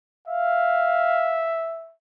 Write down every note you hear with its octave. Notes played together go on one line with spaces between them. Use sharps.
E5 F5